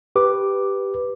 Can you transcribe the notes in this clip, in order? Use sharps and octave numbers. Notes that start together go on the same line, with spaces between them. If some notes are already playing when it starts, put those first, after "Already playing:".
G4 B4 D6